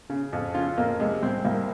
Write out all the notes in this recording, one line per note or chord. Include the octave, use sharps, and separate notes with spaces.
C#3
F2
C#3 F4
F2 A#3
C3 G#3
C2 C4
C2 A#3